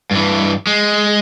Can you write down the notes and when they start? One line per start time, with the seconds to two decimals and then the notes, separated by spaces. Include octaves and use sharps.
0.11 G2 E3
0.67 G#3